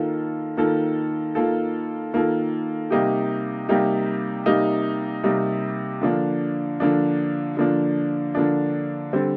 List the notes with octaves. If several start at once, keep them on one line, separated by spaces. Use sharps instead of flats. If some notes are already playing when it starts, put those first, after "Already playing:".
Already playing: D#3 A#3 F4 A4
D#3 A#3 F4 A4
D#3 A#3 F4 A4
D#3 A#3 F4 A4
C3 G3 A#3 D#4 G4
C3 G3 A#3 D#4 G4
C3 G3 A#3 D#4 G4
C3 G3 A#3 D#4 G4
D3 F3 A#3 D4
D3 F3 A#3 D4
D3 F3 A#3 D4
D3 F3 A#3 D4
D3 G3 C4